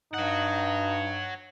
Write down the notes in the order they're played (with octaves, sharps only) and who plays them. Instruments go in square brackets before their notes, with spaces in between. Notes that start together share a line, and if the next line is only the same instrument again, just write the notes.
[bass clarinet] G2 [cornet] D#4 [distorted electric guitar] C#5 F#5